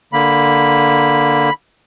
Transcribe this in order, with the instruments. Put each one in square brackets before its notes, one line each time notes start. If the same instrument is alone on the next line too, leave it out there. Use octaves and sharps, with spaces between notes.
[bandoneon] D3 A#3 [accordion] B5